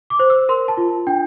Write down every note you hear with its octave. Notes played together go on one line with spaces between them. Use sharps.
D6
C5
E6
A#4 C6
A5
F4
D4 G5